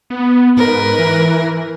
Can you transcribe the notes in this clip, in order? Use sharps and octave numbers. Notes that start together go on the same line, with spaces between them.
B3
G#2 A#4 B4
E3